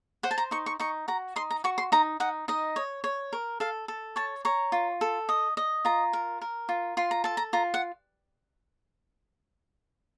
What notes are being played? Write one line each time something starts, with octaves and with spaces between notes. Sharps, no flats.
C5 F#5
A5
A#5
D#4 C#6
C#6
D#4 C#6
F#4 A#5
D#4 C6
A#5
F#4 C#6
C6
D#4 A#5
D#4 F#5
D#4 D#5
C#5
C#5
A#4
A4 F5
A4
C#5 A5
C#5 A#5
F4
A4
D#5
D#5
F4 A#5
A#4
A#4
F4
F4 C6
A#5
A4 A5
A#5
F4 A#5
F#5